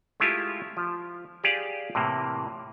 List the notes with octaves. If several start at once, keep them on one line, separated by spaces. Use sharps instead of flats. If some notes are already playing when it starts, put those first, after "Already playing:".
G#3 A3 E4 F4 G4
F3
G4 G#4 D5 F5
A2 C3 E3 A#3